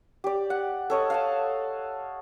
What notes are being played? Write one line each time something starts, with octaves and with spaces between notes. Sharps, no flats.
G4 D5
F#5
A4 C#5 D#5
F5 F#5 A5